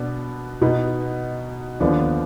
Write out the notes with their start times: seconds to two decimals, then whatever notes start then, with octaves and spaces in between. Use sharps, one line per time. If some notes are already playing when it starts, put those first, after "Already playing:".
Already playing: B2 B3 D4
0.61 B2 B3 D#4
1.80 D#2 D3 F3 B3 D4